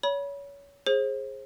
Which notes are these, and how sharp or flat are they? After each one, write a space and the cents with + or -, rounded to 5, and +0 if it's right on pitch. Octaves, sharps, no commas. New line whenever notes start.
C#5 +25 B5 -30
G#4 +0 C5 +35